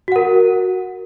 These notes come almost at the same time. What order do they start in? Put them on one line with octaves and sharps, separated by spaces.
F#4 F#5 A#4